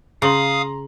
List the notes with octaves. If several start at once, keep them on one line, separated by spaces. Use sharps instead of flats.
C#3 F5 A#5 C6 D#6 F#7